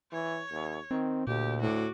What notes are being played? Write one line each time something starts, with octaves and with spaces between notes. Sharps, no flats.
E3 C#5
D#2
D#3 C4
D2 A#2 G4
A2 F#4 D6